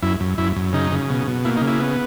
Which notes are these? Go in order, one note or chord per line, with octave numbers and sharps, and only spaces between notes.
F#2 E4
F#2
F#2 E4
F#2
C#3 D#4
C#3
B2
B2
A#3 E4
D#4
C#3
E4
B3